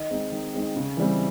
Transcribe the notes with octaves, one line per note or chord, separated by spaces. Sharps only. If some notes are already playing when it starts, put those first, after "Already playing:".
Already playing: D#3 D#5
G#3 C4 D#4
D#3
G#3 C4 D#4
C#3
E3 G3 C4